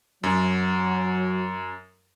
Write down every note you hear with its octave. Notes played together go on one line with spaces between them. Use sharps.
F#2 F#3